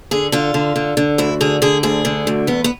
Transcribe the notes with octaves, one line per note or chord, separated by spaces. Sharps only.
D3 G#4
D3 F4
D3
D3
D3
D2 E4
D3 G#4
D3 G#4
D2 G#4
D3
D2
E2 B3
B3